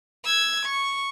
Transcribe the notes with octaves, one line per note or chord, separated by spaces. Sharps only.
E6 G#6
C#6